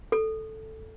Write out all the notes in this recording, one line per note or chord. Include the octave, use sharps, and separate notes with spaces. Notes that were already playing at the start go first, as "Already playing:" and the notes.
A4